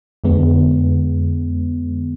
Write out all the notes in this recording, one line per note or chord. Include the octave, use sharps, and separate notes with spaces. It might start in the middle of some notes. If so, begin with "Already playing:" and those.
F2 D3 G#3 B3